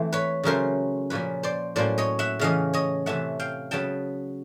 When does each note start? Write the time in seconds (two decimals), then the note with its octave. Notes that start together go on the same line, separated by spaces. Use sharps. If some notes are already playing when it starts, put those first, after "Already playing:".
Already playing: E3 A3 C4
0.13 B4 C#5
0.43 C#3 F#3 A3 C#4 A#4 C5
1.10 A#2 F3 A#3 C#4 B4 C#5
1.43 C5 D5
1.76 A2 F#3 A#3 C#4 C5 D5
1.98 C#5 D#5
2.19 E5 F#5
2.39 C#3 E3 A3 C#4 D#5 F5
2.73 C#5 D#5
3.06 C3 E3 A3 C#4 E5 F#5
3.39 F5 G5
3.71 C#3 F#3 B3 G5 A5